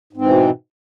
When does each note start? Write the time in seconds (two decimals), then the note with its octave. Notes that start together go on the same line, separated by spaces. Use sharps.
0.13 G#2
0.17 C4
0.21 E3
0.25 B2